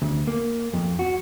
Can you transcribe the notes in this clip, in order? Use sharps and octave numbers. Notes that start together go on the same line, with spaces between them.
D2
A#3
F2
F#4